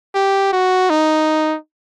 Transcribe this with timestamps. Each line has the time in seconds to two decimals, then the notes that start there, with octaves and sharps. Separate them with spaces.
0.15 G4
0.53 F#4
0.90 D#4